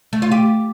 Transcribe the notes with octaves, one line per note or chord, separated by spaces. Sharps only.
A3
F4
G4